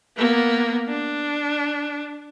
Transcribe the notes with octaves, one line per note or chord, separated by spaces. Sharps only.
A#3 B3
D4